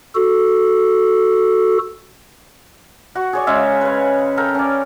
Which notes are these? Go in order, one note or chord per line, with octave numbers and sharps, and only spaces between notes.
F#4 A4
F#4 C#6
G#4 C#5 D5
C#3 G#3 E5 F5
B4 C#5
A4 A#4 G5
C#4 D5